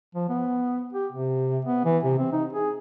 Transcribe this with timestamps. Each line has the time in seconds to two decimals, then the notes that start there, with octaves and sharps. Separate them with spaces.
0.15 F3
0.29 B3
0.93 G4
1.12 C3
1.65 B3
1.85 E3
2.04 C3
2.19 C4
2.33 D#4
2.53 G#4